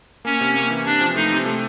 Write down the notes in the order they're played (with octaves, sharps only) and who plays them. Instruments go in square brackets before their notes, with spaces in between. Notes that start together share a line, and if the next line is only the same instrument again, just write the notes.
[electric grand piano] A#3 [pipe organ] C#4
[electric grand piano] C3
A#3
E3
[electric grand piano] C3 [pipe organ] D4
[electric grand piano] F3
[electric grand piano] A3 [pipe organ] D#4
[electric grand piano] C3
A3